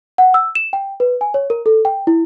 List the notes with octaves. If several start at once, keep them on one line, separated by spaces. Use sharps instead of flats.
F#5
E6
E7
G5
B4
G#5
C#5
A#4
A4
G5
E4